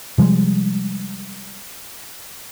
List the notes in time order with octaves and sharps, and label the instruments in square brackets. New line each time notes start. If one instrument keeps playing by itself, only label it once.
[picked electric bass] C3 F3 G3 G#3